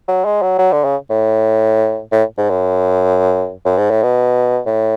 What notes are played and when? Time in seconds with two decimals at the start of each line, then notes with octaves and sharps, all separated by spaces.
0.08 F#3
0.25 G#3
0.42 F#3
0.59 F#3
0.72 D3
0.84 C#3
1.10 A2
2.12 A2
2.37 G#2
2.49 F#2
3.65 F#2
3.78 G#2
3.90 A2
4.03 B2
4.66 A2